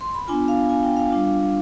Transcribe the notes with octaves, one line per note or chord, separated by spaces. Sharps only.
C6
B5
B3 D4 F4 G#5
F5
G#5
G5
F5
G3 D4 F4